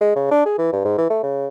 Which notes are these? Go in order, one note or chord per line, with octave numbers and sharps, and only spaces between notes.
G#3
C#3
D4
G#4
E3
G2
G#2
E3
A3
C#3